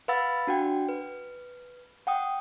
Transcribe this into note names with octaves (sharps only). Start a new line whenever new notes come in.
B4 F5 F#5 B5 E6 A6
D4 F#4 F#5 G5
B4
F#5 G5 D#6